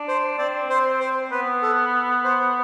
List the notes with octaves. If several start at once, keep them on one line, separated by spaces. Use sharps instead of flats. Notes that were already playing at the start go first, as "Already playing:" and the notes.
Already playing: D4
C5
C4 D5
C5
C5
B3 B4
A4
C5